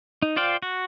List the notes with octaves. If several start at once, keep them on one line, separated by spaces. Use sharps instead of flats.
D#4
F4 C5 D5 F5 G5
F#4